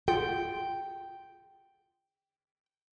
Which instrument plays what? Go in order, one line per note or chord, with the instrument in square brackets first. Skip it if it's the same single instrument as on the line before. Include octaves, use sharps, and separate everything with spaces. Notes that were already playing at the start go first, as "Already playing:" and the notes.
[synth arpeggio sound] F4 G#4 F#5 [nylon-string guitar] G5